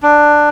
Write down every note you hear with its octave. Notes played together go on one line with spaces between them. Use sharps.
D4